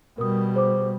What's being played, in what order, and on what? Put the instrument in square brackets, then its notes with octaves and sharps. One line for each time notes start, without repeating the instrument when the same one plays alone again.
[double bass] B2 G3 [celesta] A#4 D#6
[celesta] G#4 C5 D6